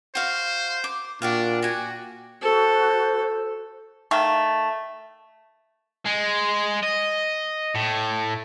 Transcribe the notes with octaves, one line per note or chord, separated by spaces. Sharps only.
F#4 C5 F5
D6
A#2 D4 F#4 G4 F5
F#4 G4 G#5
F#4 A4 C5
D#3 A3 F5
G#3
D#5
A2